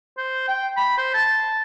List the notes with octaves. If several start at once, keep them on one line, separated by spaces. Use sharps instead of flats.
C5
G5
B5
C5
A5